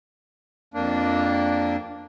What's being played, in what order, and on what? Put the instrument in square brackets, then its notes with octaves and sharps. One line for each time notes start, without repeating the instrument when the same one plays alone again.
[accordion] F2 A#3 D4